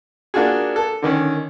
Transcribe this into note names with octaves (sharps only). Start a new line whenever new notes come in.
A#3 D4 F4 F#4 G#4
A4
D3 D#3 C#4